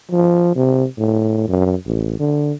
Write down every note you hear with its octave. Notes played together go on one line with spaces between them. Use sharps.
F3
C3
A2
F#2
A1
D3